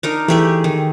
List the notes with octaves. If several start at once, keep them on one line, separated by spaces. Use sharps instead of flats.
D4 D#4 A#4
E3 A3 G4 G#4
D#3